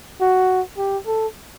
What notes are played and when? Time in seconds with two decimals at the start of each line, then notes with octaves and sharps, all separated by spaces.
0.21 F#4
0.78 G4
1.07 A4